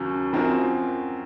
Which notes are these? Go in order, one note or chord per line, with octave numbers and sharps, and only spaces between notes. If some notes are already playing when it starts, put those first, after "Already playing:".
Already playing: D#2 C#3 F#3 C#4
F#2 F3 C4 F#4 A#4